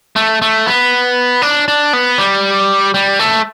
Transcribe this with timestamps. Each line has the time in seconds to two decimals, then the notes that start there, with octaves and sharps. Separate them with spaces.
0.16 A3
0.42 A3
0.66 B3
1.42 D4
1.68 D4
1.93 B3
2.18 G3
2.94 G3
3.19 A3